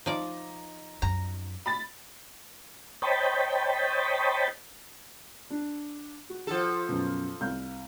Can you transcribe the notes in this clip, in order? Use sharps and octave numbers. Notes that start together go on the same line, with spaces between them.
F3 D#4 D5
F#2 A#5
B5 A6
C5 C#5 D#5 G5 A5 B5
D4
F#4
F3 A4
F#2 B2
C2 F5 G6